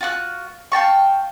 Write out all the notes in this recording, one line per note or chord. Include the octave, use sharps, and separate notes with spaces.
F4 F#4 C#6 F#6
F5 G5 A5 C#6